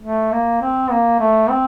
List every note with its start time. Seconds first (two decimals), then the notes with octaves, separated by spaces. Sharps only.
0.01 A3
0.32 A#3
0.62 C4
0.91 A#3
1.20 A3
1.50 C4